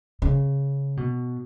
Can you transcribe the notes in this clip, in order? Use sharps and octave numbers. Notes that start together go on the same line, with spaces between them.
C#3
B2